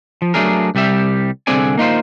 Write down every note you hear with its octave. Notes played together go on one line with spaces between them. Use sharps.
F3
F#3 A3 D4 G#4 A#4
C2 G3 G4 E5
C2 D3 C4 G#4 D5 G#5
A#3 D#4 F4 C5